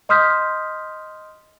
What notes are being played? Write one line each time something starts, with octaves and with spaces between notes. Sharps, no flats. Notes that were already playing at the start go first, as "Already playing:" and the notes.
D#5 C6 D#6 F6 G6 B6